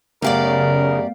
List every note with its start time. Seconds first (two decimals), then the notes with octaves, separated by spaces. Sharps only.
0.22 F#2 C#3 A3 B3 G4 A#4 D5 F5